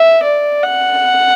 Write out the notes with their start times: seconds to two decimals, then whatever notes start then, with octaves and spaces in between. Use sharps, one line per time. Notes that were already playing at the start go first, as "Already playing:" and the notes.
Already playing: E5
0.23 D5
0.63 F#5